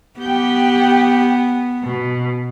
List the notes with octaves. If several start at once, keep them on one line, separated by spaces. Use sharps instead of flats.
B3 G4 G5
B2